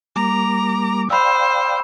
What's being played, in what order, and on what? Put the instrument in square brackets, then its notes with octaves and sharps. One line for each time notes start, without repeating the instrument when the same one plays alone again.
[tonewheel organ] G3 A#3 D6 [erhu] A#5
[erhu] C5 [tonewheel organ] D5 F5 G5 [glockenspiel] B5 E6